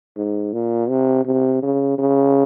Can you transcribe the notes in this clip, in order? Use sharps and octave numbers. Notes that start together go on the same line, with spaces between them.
G#2
A#2
C3
C3
C#3
C#3